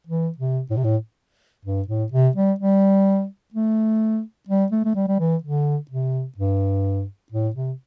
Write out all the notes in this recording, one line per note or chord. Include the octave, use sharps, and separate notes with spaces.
E3
C3
A2
C3
A2
G2
A2
C3
G3
G3
A3
G3
A3
A3
G3
G3
E3
D3
C3
G2
A2
C3